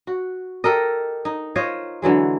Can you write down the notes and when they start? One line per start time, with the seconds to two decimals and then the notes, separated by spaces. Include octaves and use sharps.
0.07 F#4
0.64 G4 A4 A#4 D#5
1.25 D#4
1.56 F4 C5 C#5 D#5
2.02 D3 E3 F#3 G#3